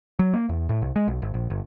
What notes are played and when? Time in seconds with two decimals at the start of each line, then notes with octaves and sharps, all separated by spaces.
0.19 F#3
0.34 A#3
0.49 E2
0.69 A2
0.82 C2
0.96 G#3
1.08 B1
1.22 G#1
1.34 A#1
1.50 G1